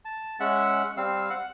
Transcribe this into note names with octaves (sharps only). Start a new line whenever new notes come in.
A5
G#3 C#4 E5 F#5
G3 C4 F5 E6
F#5